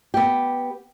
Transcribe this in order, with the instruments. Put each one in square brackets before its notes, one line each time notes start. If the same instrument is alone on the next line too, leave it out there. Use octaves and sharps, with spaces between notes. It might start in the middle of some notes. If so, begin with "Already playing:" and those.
[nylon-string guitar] B3 G4